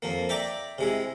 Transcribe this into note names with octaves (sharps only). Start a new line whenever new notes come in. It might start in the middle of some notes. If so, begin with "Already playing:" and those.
F2 F3 A#3
D5 E5 G5 A#5 D6
C3 G#3 E4